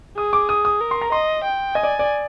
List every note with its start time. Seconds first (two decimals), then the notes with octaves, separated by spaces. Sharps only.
0.17 G#4 D#6
0.33 D6
0.49 D#6
0.65 D#6
0.81 A#4
0.91 C6
1.01 A#5
1.12 D#5 C6
1.44 G5
1.75 D#5 G#5
1.83 D5
1.99 D5